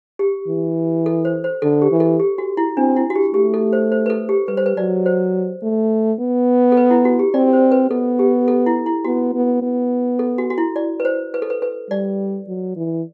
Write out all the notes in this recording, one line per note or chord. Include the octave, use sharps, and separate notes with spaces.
G4
E3
A4
C5
C5
D3 A4
G4
E3
A4
G4
F#4
E4
C4 D4
E4
F#4
G4
A3 G4
A4
C5
C5
B4
A4
G4
G3 B4
C5
B4
F#3 D5
C5
A3
B3
A4
B4
E4
F#4
G4
C4 D5
C5
B4
B3 A4
G4
A4
E4
E4
B3 F#4
B3
B3
A4
F#4
F#4
E4
D5
B4
C5
B4
A4
B4
B4
G3 D5
F#3
E3